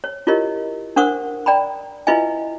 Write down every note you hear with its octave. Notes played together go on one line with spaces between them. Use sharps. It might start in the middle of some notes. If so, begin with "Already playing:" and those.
C#5
E4 F4 G4 A#4 C#5 D#5
D4 A#4 C5 F#5 C#6 D#6
D5 G5 A#5 B5
E4 F4 B4 D#5 E5 G#5